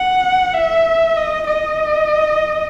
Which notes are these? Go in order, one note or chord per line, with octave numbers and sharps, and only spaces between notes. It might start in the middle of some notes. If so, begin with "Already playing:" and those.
Already playing: F#5
E5
D#5
D#5